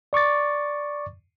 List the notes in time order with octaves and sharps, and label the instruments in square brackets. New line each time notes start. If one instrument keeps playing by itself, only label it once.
[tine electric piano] D5 C#6 D6 A6